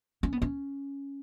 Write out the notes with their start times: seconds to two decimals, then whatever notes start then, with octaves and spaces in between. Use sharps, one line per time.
0.23 C#4
0.33 B3
0.42 C#4